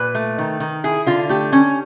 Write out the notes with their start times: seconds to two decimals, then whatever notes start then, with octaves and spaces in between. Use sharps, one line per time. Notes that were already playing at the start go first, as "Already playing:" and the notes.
Already playing: A#2 B4
0.15 A3
0.38 D#3
0.60 D#3
0.84 E4 G#4
1.06 D3 F4
1.29 A3 G4
1.52 C#4